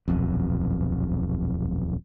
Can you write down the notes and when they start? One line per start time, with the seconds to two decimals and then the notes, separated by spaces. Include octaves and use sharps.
0.08 D#1 B1 F2